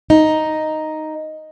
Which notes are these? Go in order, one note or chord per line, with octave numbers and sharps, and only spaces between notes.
D#4